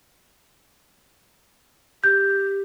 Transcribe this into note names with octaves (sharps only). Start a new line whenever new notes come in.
G4 G6